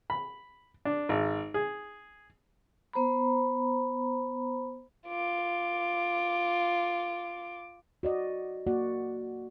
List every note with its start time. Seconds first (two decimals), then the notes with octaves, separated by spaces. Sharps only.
0.10 B5
0.85 D4
1.09 G#1
1.54 G#4
2.93 B3 C5 A#5 B5
5.08 F4 D6
8.03 F#4 D5 D#5
8.67 A#3 F#4 D5 F#5